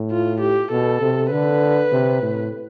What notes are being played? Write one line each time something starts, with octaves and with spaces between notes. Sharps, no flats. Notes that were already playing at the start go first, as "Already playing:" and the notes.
Already playing: A2
F4
G4
B2 A4
C3
D3 B4
C3
A2